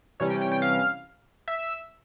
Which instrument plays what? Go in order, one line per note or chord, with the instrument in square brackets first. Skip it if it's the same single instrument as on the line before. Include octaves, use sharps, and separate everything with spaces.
[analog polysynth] C3 E3 G3 C#4 C#5
G5
G5
G5
F5
E5